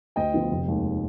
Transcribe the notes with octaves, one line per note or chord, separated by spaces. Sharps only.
D2 D#5 G5
D3 F3 B3
F1
D#2 D#3 G#3